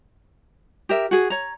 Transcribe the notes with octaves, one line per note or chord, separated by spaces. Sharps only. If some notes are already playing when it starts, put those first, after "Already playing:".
G4 A#4 E5
F#4 G#4
C#5 A#5